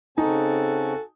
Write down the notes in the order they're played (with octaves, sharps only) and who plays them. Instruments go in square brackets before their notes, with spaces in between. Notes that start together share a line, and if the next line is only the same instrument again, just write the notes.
[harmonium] C#3 C4 [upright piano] D#4 [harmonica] F#4 G#5 A5 [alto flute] A4